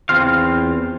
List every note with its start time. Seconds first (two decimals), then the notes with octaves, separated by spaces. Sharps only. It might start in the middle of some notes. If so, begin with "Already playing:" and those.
0.09 E2 C4 F4 F5